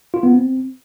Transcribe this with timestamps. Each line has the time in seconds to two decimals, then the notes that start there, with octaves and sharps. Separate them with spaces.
0.14 F4
0.23 B3
0.33 C4